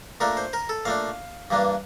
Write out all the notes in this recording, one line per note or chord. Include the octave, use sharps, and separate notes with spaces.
A#2 A3 D4 A#4
C5
A#4
A4
A#2 A3 D4 F5
G2 E3 A#3 D4